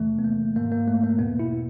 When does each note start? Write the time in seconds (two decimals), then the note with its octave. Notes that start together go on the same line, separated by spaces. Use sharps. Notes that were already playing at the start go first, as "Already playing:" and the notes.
Already playing: E2 C3 E3 A3
0.19 B3
0.24 A#3
0.55 G#2 D#3 A#3
0.72 A#3
0.88 A3
1.03 A#3
1.19 E2 B2 B3
1.39 E4